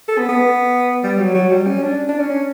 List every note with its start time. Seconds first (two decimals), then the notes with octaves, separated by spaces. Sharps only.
0.09 A4
0.18 B3
0.29 B3
1.03 G3
1.19 F#3
1.35 F#3
1.51 G3
1.67 C#4
1.83 D4
2.09 D4
2.20 C#4
2.30 C#4